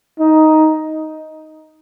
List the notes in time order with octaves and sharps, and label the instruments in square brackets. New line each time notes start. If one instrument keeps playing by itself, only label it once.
[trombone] D#4